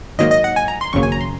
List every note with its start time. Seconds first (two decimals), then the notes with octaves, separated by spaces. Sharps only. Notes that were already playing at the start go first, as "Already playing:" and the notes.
0.19 G#2 D#3 F#3 A#3 D#5
0.31 D#5
0.44 F#5
0.56 G#5
0.68 A#5
0.81 C6
0.93 G#1 F#2 C#3 F#3 A#3 C#6
1.03 G#5
1.12 A#5
1.21 C6